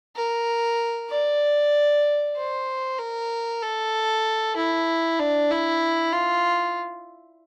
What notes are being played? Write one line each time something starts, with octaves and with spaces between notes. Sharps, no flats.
A#4
D5
C5
A#4
A4
E4
D4
E4
F4